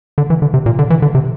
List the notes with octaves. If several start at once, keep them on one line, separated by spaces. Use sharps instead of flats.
D3
E3
D3
C3
A#2
D3
E3
D3
C3